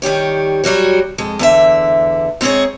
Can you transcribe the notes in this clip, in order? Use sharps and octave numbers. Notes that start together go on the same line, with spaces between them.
D#3 G3 G4 C#5
F#3 G3 F#4 C#5
F2 G#3
E2 D3 E5
G#2 C4 C#4 G#4 C#5